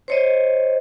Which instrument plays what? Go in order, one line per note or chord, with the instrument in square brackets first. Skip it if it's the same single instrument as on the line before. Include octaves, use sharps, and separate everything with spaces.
[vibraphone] C5 C#5 D#5